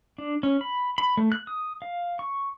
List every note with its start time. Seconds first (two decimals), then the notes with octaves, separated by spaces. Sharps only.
0.18 D4
0.43 C#4
0.61 B5
0.98 B5
1.17 A3
1.32 F#6
1.47 D#6
1.82 F5
2.19 C#6